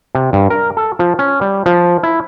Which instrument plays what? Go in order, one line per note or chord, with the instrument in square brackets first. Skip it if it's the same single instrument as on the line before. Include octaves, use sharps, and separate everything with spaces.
[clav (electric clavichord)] C3
G2
A#4
A4
F3
C#4
G3
F3
E4